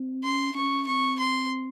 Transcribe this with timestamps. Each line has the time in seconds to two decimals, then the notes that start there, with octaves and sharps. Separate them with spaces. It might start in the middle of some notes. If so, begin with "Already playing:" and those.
Already playing: C4
0.24 C#4 C6
0.55 C#4 C#6
0.87 C4 C#6
1.19 C6